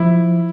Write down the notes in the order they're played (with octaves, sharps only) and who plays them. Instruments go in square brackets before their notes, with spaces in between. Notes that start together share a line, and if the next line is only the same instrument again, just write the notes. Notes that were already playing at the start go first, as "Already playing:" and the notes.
Already playing: [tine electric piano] F3 [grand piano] E4